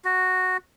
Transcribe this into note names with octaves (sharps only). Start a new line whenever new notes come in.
F#4